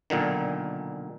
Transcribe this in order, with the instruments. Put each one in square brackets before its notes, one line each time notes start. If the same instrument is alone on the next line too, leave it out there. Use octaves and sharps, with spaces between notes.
[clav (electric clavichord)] B1 A#2 D3 D#3